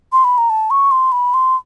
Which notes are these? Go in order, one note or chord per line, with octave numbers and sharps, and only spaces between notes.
C6
B5
A#5
A5
C#6
C6
B5
C6